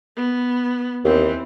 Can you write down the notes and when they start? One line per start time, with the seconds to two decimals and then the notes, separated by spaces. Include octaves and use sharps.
0.16 B3
1.05 D#2 E3 C4